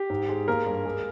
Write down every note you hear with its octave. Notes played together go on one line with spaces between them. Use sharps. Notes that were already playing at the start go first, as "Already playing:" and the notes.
Already playing: G4
G#2
G#3
A#3 A#4
G2
G#3